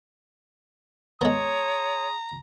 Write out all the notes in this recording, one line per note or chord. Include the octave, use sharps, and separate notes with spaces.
G#3 B3 G#4 C#5 A#5 C6 D#6